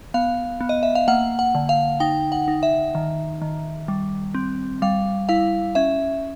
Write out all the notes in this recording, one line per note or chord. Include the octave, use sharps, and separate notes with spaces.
B3 F5
B3
D#5
E5
F5
A#3 F#5
F#5
D3
F5
D#4 G5
F#5
D#4
E5
D#3
D#3
G3
C4
G3 F5
E4 F5
C#4 E5